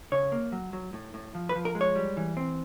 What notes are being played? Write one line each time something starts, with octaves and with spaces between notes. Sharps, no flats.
C#3 C#5
A#3
F#3
F#3
A2
A2
F3
B4
F3
A#4
G#3
C#5
G3
E3
C4